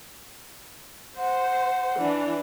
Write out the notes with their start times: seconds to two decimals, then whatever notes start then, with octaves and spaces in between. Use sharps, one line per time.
1.17 C5 F#5
1.99 E3 D4